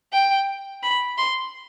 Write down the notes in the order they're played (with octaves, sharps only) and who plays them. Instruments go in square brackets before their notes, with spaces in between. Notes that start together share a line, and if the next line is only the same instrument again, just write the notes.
[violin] G5
B5
C6